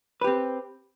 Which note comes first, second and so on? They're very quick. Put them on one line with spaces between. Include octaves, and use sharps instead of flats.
B4 G4 C4